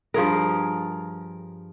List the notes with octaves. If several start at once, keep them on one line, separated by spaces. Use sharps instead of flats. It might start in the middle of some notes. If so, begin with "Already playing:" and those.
G2 F3 G#4 A#4